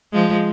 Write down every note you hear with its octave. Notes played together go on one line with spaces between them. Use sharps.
F3 G#3